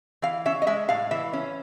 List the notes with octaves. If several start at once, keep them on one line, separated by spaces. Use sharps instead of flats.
E3 F5
C#4 E5
D#5
G#3 E5
A2 F5
E3 E5
C#4